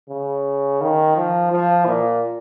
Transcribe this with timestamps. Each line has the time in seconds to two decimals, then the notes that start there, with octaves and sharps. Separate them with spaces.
0.10 C#3
0.81 D#3
1.17 F3
1.52 F3
1.86 A#2